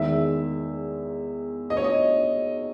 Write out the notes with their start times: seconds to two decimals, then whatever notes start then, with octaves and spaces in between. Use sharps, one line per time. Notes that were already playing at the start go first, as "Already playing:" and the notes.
Already playing: E2 D#3 G#3 D#4 E5
1.70 D#5
1.77 C#5
1.84 D#5